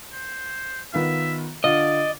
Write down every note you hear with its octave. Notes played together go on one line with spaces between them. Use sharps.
C5
D#3 B3 F4 E5
D3 F4 D5 D#5